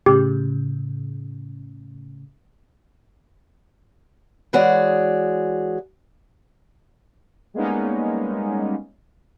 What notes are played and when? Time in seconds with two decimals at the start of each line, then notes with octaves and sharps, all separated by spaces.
0.06 A2 C#3 G4
4.53 E3 G#3 F#4 G#4 C#5 D5
7.54 G3 G#3 A#3 B3 C#4 D#4